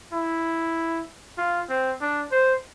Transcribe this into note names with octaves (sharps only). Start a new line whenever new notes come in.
E4
F4
C4
D4
C5